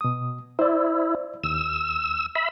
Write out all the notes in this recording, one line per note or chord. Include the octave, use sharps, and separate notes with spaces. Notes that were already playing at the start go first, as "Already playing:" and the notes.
B2 D#6
E4 C5 D5
D#2 E6
E5 B5